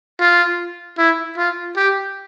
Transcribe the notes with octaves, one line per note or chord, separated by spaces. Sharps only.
F4
E4
F4
G4